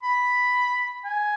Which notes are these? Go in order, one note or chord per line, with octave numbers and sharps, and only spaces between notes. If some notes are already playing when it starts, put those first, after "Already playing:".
B5
G#5